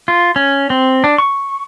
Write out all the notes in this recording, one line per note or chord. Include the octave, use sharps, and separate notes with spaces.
F4
C#4
C4
D4
C#6